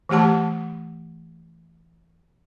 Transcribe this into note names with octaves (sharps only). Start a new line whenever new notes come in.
E3 A3 G4 F#5 A5